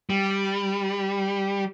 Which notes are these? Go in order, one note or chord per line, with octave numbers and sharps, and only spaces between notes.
G3